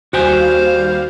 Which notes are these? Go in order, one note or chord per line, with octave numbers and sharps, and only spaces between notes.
D#2 G3 F#4 C5 F5 G5 G#5